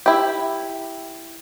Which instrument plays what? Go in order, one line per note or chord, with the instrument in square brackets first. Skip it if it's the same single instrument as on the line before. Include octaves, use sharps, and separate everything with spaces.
[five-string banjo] E4 G4